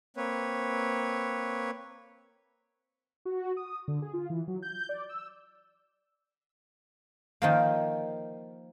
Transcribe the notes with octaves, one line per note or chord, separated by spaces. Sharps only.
A#3 C4 B4 C#5
F#4
D#6
D3
G#4
F4
E3
F#3
G6
D5
E6
D#3 F3 A#3